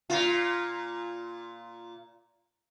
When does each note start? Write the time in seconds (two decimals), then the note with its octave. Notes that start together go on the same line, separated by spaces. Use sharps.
0.10 A#2 F4